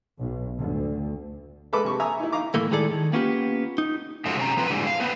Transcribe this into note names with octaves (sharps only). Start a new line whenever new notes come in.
B1
D2
G#3 A4 B4 A5 B5 D6
C3 C#6
E5 G#5 A#5 D#6
D#4 E4
D#4 F5 A#5 D6
A2 E3 A3 A#3
D#3 G#3 E4 G#4 A4 D5
D#3
A#3 B3 C#4 F4 G4
D#4
F#2 C#3 F3 G#3 A3 F#4
C3 C#4 D5 A#5
F3 C4 F4 B4
G#2 D3 E3 G3 G#3
F5
B3 C4 B4